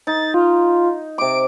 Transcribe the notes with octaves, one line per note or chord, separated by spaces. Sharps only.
D#4 A6
F4
C3 D6 D7